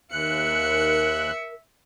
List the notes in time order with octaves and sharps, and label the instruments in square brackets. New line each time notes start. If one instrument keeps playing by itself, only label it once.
[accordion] D#2 F#6 [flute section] A#4 [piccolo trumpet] E5 [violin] C#7